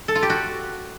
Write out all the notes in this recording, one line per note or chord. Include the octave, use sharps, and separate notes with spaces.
A4
F4
G4
F#4